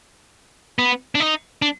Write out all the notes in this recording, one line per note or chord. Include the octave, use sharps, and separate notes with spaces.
B3
D4
D#4
D4